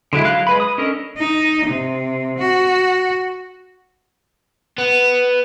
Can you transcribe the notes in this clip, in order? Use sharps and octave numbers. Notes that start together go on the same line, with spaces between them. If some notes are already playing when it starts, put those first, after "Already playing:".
D3 F#3 G#3 E4
F#3 F5 F#6
G#3 B4 B5
D#6
C#4 D4 A4 A#4 D#5
D#4
C3
F#4
B3